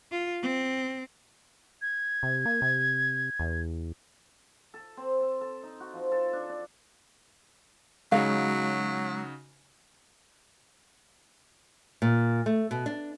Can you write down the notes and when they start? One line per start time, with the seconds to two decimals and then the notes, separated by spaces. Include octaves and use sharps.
0.11 F4
0.43 C4
1.82 G#6
2.23 C3
2.46 A#3
2.62 C3
3.40 E2
4.74 A4
4.97 C4
5.21 A4
5.41 A4
5.63 D#4
5.80 F#4
5.93 F3
6.12 A4
6.33 D4
6.49 D4
8.12 C#3 F#3 G#3 D#4 F#4 F5
12.02 A#2
12.46 A3
12.71 B2
12.86 D4